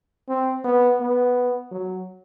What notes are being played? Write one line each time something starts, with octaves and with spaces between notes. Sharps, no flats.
C4
B3
B3
F#3